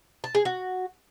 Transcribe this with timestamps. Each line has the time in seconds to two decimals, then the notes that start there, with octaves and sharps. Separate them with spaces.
0.24 A5
0.35 G#4
0.45 F#4